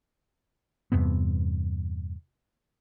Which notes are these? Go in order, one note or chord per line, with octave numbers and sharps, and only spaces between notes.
E2 G2 C3 B3